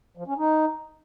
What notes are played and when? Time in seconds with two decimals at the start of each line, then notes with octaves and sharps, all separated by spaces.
0.17 F3
0.27 C#4
0.38 D#4